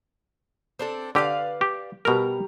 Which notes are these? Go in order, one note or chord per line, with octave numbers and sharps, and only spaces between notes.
C4 D4 A4
D3 G4 B4 D5 F5
G4
B2 G3 A#4 A#5